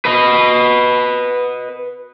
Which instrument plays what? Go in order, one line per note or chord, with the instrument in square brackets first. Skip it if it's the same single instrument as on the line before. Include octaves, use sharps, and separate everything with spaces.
[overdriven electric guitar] B4 D#5